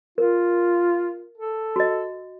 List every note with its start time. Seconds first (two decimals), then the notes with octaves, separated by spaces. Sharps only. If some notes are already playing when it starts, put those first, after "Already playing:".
0.18 F4 A#4
1.37 A4
1.76 F#4 D#5